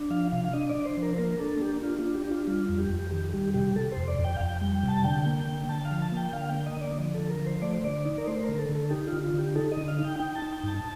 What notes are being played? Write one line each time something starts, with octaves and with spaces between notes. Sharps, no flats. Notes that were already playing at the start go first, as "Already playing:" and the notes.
Already playing: D4
F3 F5
C3 F5
F5
D4 D#5
D5
D4
C5
F3
A#4
C5
A#3 A#4
D4 A4
A#3 G4
D4 F4
F4
D4
G4
D4 F4
G3 F4
F2
G4
F2
D#3 G4
G3 G4
C3 G4
C3 A4
C5
F2
D5
F2
G5
F5
F2 G5
G3 G5
G5
C3 A5
D3 G5
A#3
D3
D3 A5
F5
F3
A5
A#3 G5
D3 F5
G5
A#3
D#5
D3 D5
F3
A4
D3
A#4
F3
C5
A3 D5
C5
D3 D5
D#4
A#4
A3 C5
A#4
D3
A4
D3
A4
D#4 G4
D3 F4
F4
D3 G4
D#4 A4
D3 D#5
F5
D#4
G5
D#4 G5
A5
D#4
G5
G2 A5